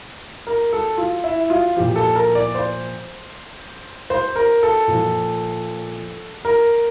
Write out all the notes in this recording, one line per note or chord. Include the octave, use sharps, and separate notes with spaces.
A#4
A4
F4
E4
F4
A#2 F3 G4
A4
A#4
D5
C5
C5
A#4
A4
A#2 F3
A#4